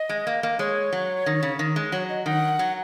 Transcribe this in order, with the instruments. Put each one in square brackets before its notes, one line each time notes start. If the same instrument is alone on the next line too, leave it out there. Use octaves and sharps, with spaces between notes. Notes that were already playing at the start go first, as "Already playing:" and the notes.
Already playing: [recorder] D#5
[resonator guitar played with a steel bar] G#3
A#3
A#3
[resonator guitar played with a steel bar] G#3 [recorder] C#5
[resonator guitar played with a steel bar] F#3
D#3
C#3
D#3
G#3
[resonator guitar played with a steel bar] F#3 [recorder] C#5
[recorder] D#5
[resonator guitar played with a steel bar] D#3 [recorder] F#5
[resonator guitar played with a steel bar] F#3